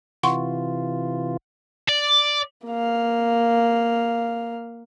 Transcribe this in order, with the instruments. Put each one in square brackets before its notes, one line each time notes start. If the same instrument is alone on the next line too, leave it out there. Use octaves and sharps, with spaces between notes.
[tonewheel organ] C3 E3 F4 [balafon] F#5 C6 C#6
[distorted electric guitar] D5
[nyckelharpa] A#3 F5